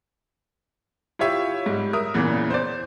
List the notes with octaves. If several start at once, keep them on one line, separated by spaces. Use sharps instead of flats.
E4 F4 G4 C#5 E5
G#2 G3
A#4 E5 D#6
E2 A#2 C#3 E3
C5 D5